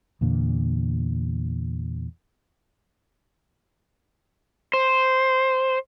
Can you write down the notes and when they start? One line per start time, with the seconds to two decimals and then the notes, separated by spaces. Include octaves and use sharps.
0.21 E2 A#2 D3
4.74 C5